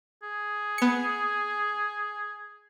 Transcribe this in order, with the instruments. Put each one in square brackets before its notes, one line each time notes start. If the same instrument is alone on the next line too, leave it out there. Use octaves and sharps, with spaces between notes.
[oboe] G#4
[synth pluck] B3 C#7